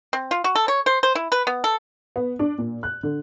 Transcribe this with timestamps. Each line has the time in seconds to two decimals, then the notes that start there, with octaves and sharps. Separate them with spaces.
0.13 C4
0.31 F4
0.44 F#4
0.55 A4
0.68 C#5
0.86 C5
1.03 C5
1.15 E4
1.32 B4
1.47 B3
1.64 A4
2.16 B3
2.39 D4
2.58 A#2
2.83 F#6
3.03 D3